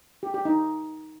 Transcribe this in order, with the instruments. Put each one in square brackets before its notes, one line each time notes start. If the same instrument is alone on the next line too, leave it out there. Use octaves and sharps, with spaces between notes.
[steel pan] G4
G4
D#4